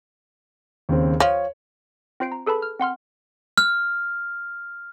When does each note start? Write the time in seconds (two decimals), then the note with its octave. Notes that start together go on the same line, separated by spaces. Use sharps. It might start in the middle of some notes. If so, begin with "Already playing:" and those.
0.89 D#2 C#3 C4
1.20 F3 C#5
2.20 C4 F4 C5 C7 D7
2.32 A#5
2.46 G#4 A4 B4 A5 B5
2.62 F6
2.80 C4 F#5 C6 F6
3.58 F6